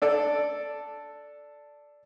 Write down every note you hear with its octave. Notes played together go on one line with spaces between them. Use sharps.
D4 A4 D5